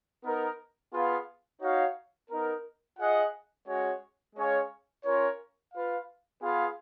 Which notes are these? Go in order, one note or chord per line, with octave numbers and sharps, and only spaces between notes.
B3 D#4 A#4
B3 F4 G#4 B4 F5
D#4 F#4 C#5 F5
B3 D#4 A#4
F4 G#4 D#5 F#5
G#3 C#4 F#4 C#5
G#3 C#4 G#4 C#5 F5
C#4 F4 A#4 C#5
F4 B4 F5
B3 F4 G#4 B4 F5